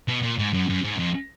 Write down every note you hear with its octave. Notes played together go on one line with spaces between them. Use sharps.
B2
A#2
G#2
F#2
F#2
G#2
F#2
F2